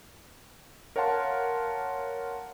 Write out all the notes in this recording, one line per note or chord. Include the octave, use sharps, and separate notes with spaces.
A#4 C#5 F5 F#5 A5 C6